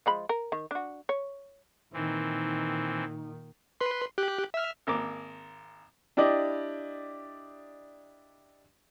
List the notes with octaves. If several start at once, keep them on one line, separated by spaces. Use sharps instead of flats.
F3 G#3 B5
A#4
D#3
D4 F#4
C#5
A#2 D#3 E3 C4 D#4
B4 C6
G4 F#6
E5 F6
G#1 A#3 D6
D4 E4 G4 D5 D#5